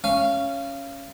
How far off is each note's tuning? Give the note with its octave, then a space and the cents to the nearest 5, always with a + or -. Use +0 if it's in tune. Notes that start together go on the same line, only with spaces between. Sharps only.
C#4 +0 F5 -30